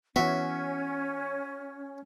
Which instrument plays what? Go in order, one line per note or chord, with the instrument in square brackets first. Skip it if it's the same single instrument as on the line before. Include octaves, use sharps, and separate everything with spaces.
[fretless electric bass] E3 B3 [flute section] C#4 [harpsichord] F#4 E5